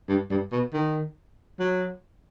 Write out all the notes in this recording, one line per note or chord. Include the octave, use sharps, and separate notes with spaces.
G2
G2
B2
D#3
F#3